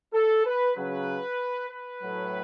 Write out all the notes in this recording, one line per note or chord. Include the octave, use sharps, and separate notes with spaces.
A4
B4
C#3 F#3 B4
B4
A2 F#3